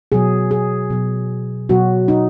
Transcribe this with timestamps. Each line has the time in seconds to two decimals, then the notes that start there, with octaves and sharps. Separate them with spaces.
0.12 B2 F#3 G#4
0.51 G#4
0.90 B2 F#3
1.69 B2 F#3 F#4
2.08 D#4